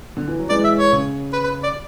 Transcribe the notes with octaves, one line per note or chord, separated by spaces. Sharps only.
D3
E3
F#3
E3 G#3 D5
E5
C#5
C#3
B4
B4
D5